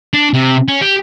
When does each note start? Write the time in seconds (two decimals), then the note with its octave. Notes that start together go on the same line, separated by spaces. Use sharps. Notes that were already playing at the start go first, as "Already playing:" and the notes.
0.14 D4
0.34 C3
0.68 C#4
0.81 G4